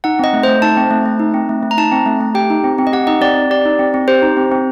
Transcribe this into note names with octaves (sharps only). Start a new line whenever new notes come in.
D#4 F#5
C4 D#5
A3
C5
A3
D#4 A5
C4
A3
A3
D#4
C4
A3
A3
A#5
D#4 A5
C4
A3
A3
G4 G5
D#4
C4
C4
D#5
G4 F#5
D#4 D#5
C4 D5
C4
G4 D5
D#4
C4
C4
G4 C5
D#4
C4
C4